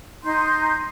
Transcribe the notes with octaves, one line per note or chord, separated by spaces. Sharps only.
D#4 C6 G6